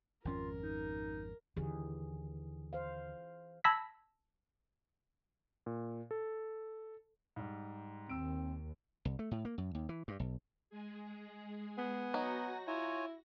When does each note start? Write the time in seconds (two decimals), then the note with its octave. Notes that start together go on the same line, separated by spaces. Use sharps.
0.25 G#1 F2 C#4 F4 A#4
0.63 D#4
1.56 D#2 D3 E3 G#4
2.73 C5 F5
3.64 A5 B5 E6 G#6 A#6 B6
5.66 A#2
6.11 A4
7.36 G#2 G3
8.09 D#2 C4 E6 D7
9.05 C2
9.19 A3
9.31 A2
9.45 A#3
9.58 F#2
9.75 D#2
9.89 E3
10.08 G2
10.20 B1
10.70 G#3 G#4
11.78 B3 F#5 G#5
12.14 F#3 D#4 F#4 A#6
12.67 E4 F4 C#5 G#5